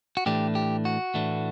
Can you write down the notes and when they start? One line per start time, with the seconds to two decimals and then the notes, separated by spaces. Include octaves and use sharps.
0.17 F#4
0.26 A2 E3 A3 D4 G4
0.55 G4
0.85 F#4
1.14 A2 E3 A3 D4